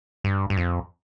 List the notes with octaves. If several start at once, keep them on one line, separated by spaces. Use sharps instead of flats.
G2
G2
F2